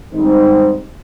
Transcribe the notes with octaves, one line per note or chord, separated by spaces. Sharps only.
G#2 D#3 G3 C4 D#4